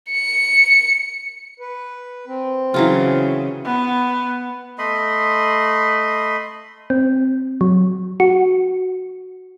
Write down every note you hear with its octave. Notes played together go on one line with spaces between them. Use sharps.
C#7
B4
C4
C#3 E3 F#3 F4
B3
A3 D#5 B5 C6
C4
F#3
F#4